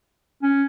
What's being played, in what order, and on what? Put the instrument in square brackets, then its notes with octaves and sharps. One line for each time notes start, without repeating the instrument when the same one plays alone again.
[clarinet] C#4